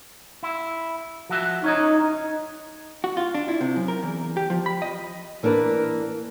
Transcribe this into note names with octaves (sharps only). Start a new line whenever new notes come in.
E4
F3 F#4 E5
C#4 D#4 C#5 D#5
F#4
F4
D4
E4
C3
F#2
A#4
E2
G4
F3
B5
D#5
E3 A#3 D4 A#4 B4